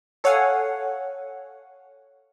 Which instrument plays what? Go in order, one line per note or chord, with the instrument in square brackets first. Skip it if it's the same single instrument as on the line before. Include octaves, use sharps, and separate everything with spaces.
[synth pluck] A4 C#5 F5 F#5 G#5